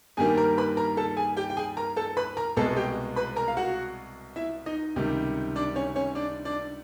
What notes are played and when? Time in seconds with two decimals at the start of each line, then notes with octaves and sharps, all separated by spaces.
0.17 G2 D#3 G3 A#3 G#4 G#5
0.37 A#4 A#5
0.58 B4 B5
0.77 A#4 A#5
0.97 A4 A5
1.17 G#4 G#5
1.37 G4 G5
1.50 G5
1.57 G#4 G#5
1.77 A#4 A#5
1.96 A4 A5
2.17 B4 B5
2.37 A#4 A#5
2.57 C2 B2 G#3 B3 A4 A5
2.77 G4 G5
3.16 B4 B5
3.36 A#4 A#5
3.48 F5
3.57 F#4 F#5
4.36 E4 E5
4.66 D#4 D#5
4.96 C#2 C3 D#3 G3
5.56 D4 D5
5.76 C#4 C#5
5.96 C#4 C#5
6.15 D4 D5
6.45 D4 D5